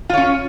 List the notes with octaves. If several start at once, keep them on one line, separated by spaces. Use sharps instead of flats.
C#4 F4 C#5